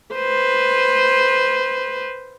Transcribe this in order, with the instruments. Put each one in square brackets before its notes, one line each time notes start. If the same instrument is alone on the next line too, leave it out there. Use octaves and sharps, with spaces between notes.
[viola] B4 C5